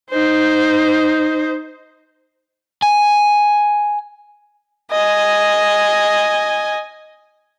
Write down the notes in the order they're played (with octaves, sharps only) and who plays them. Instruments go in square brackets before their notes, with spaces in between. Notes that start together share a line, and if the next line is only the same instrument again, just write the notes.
[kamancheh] D#4 C5
[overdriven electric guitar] G#5
[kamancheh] D#5 G#5